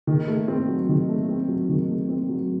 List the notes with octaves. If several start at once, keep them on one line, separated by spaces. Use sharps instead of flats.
D#3
A3
C4
F#3
D#3
A3
C4
F#3
D#3
A3
C4
F#3